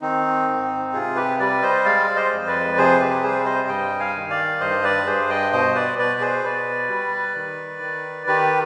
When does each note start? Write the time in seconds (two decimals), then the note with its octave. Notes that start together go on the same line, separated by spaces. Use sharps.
0.01 D#3 C4 D#4
0.48 G#2
0.93 C3 F4 G#4
1.16 G4 B4
1.39 G3 B4 D5
1.62 C5 D#5
1.85 G#3 D5 F5
2.16 C5 D#5
2.32 F2
2.46 B4 D5
2.78 C3 G#4 C5
2.99 G4 B4
3.23 G3 G#4 C5
3.46 C5 D#5
3.68 G2 D#5 G5
3.99 F5 G#5
4.15 D#3
4.30 D5 F5
4.60 G2 C5 D#5
4.84 B4 D5
5.06 G2 G#4 C5
5.29 D#5 G5
5.52 B2 C5 D#5
5.75 B4 D5
5.98 B2 B4 D5
6.20 G#4 C5
6.44 B2 B4 D5
6.89 G3
7.35 D#3
7.82 D#3
8.27 D#3 G4 B4